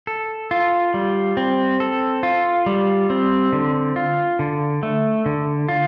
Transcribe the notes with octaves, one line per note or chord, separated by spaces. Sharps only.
A4
F4
G3
C4
A4
F4
G3
C4
D3
F4
D3
A3
D3
F4